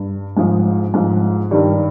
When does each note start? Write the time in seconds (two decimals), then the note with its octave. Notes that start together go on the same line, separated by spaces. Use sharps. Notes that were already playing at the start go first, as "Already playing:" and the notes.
Already playing: G2
0.37 G#2 F3
0.94 G#2 F3
1.51 G2 D#3 G3